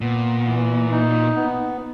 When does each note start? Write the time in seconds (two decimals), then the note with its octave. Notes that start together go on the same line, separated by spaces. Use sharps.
0.01 A#2 B3
0.46 E3
0.92 D#4
1.36 B3